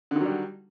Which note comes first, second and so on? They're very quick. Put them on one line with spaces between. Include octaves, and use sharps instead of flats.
D3 D#3 F#3 G3